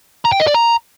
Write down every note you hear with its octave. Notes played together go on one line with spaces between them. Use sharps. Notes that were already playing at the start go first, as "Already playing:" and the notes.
A#5
G5
D#5
D5
A#5